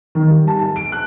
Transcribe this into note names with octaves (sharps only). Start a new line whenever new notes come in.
D#3
G3
A5
A5
D7
F#6